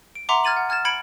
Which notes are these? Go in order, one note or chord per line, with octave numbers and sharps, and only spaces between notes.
D7
E5 F#5 A#5 C6 D6
F6 G#6 A6 D#7 F#7
F#5
G#5 F6 G#6 A6 E7
B5 G#6 C#7 D7 F#7